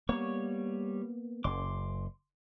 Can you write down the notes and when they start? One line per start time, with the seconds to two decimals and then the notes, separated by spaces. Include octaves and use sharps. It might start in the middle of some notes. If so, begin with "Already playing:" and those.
0.09 G3 A#3 B3 C#5 C#6
1.44 F#1 F#2 C6 D6